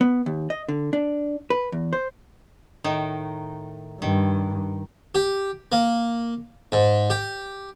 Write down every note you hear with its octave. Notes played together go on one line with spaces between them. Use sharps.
B3
D#2
D#5
D3
D4
B4
E2
C5
A2 D#3 D#4
G2 D#3
G4
A#3
G#2
G4